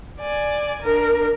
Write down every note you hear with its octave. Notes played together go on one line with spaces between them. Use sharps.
D5 G#5
D4 A#4